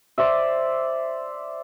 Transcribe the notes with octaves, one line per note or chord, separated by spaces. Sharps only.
C5 D5 E5